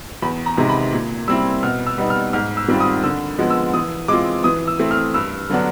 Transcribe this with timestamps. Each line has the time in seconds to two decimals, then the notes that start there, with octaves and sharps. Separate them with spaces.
0.22 E2 B5
0.46 A#5
0.57 C3 D#3 G#3
0.69 B5
0.92 A#2
1.28 G3 C4 E4 E6
1.63 B2 F6
1.87 E6
1.98 G3 B3 D#4
2.10 F6
2.33 G#2 F6
2.57 E6
2.68 D#3 G3 C4 F4
2.80 D#6
3.03 D3 E6
3.39 F3 G#3 B3
3.50 E6
3.73 E3 D#6
4.08 G#3 C4 F4 D6
4.44 E3 D#6
4.67 E6
4.79 A3 C4 E4
4.91 F6
5.14 G2 E6
5.50 D3 F#3 B3 D4